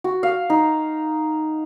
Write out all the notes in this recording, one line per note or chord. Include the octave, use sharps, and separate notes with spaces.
F#4
F5
D#4